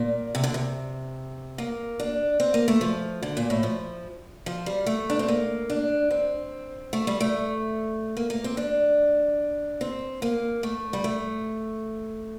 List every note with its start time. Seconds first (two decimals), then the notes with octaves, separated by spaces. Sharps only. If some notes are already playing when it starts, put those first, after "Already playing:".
Already playing: A#2
0.35 C3
0.44 D3
0.54 C3
1.58 A#3
1.99 D4
2.40 C4
2.54 A#3
2.68 A3
2.81 F3
3.23 D3
3.37 A#2
3.50 A2
3.63 F3
4.46 F3
4.66 G3
4.86 A3
5.10 D4
5.19 C4
5.28 A#3
5.70 D4
6.11 C4
6.93 A3
7.07 G3
7.21 A3
8.17 A#3
8.30 A#3
8.44 C4
8.57 D4
9.81 C4
10.22 A#3
10.63 A3
10.93 G3
11.04 A3